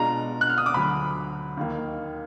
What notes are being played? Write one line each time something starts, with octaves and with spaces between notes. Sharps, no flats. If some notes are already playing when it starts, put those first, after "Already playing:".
Already playing: B2 G#3 D4 F4 A#5
F#6
F6
D#6
D6
D2 D3 F#3 B5
D#2 D#3 A#3